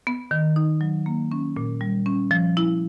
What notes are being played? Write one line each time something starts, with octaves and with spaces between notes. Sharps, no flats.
B3
D#3
D#4
F#3
A#3
C#4
A#2
G3
C#4
F3
E4